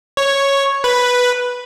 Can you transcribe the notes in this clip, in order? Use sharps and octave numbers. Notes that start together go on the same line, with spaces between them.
C#5
B4